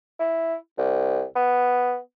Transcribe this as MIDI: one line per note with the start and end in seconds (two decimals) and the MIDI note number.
0.20 0.55 64
0.78 1.24 36
1.35 1.98 59